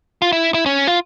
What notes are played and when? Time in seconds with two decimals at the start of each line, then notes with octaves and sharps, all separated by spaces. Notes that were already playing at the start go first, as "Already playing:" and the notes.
0.22 F4
0.32 E4
0.54 E4
0.66 C#4
0.87 F4